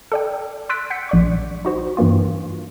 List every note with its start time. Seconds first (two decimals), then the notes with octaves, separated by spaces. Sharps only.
0.12 A4 D5 G5
0.69 C6 E6 F#6 A6 B6 D7
0.90 F#5 G6 B6 C#7
1.09 A#1 D5 C#6
1.65 D#4 F#4 C5
1.97 G2 E3 A#3 F4